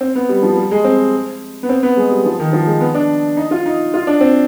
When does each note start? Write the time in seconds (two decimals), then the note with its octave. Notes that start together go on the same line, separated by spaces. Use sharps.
0.01 C4
0.15 B3
0.29 G3
0.43 F3
0.56 G3
0.71 G#3
0.84 C4
1.63 B3
1.69 C4
1.83 B3
1.97 G#3
2.10 G3
2.25 F3
2.40 D#3
2.53 F3
2.67 G#3
2.81 B3
2.95 D4
3.37 D#4
3.51 F4
3.66 D#4
3.94 F4
4.07 D4
4.21 C4